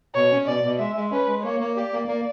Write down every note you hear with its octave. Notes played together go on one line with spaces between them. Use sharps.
B2 C#5
C#4
B2 D5
B2
G#3 E5
G#3
C#4 B4
G#3
A#3 C#5
A#3
G4 D5
A#3
A#3